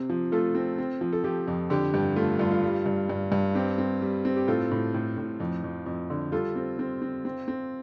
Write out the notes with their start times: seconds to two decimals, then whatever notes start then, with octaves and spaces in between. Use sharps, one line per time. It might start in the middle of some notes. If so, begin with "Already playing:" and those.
Already playing: C3 C4
0.10 F3
0.32 A3 F4 A4
0.55 C4
0.78 C4
1.01 F3
1.13 A4
1.24 F3 G4
1.48 F2
1.70 D3 G4
1.94 G2 G4
2.16 A3 F4
2.39 G2 F4
2.51 F4
2.63 G3
2.86 G2
3.09 G2
3.32 G2
3.55 C4 G4
3.78 C4
4.02 G3
4.25 C4
4.36 G4
4.47 A2 F4 A4
4.71 A2
4.94 A2
5.18 A2
5.40 F2
5.64 F2
5.86 F2
6.10 D3
6.32 G3 F4 A4
6.56 C4
6.79 C4
7.02 C4
7.25 C4
7.48 C4